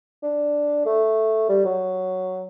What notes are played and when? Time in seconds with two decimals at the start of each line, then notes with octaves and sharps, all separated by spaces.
0.23 D4
0.86 A3
1.49 G3
1.65 F#3